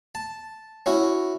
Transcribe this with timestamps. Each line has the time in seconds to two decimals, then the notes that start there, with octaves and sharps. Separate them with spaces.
0.15 A5
0.86 C#4 E4 F#4